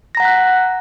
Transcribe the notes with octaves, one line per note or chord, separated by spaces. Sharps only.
F#5 A#5 F#6 A#6 B6